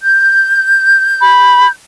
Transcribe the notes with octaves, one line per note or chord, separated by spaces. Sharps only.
G6
B5